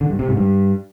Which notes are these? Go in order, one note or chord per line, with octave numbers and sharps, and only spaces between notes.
D3
G2
C3
G#2
G2